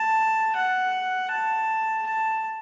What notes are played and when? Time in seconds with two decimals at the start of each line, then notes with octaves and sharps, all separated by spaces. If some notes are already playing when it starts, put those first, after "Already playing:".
Already playing: A5
0.55 F#5
1.31 A5
2.07 A5